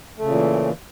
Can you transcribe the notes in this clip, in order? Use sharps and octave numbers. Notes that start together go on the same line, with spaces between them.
A#2 C#3 E3 A3